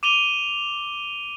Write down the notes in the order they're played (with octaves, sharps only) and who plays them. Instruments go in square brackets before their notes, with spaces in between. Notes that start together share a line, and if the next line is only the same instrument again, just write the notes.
[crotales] D6 D#7 F7 G7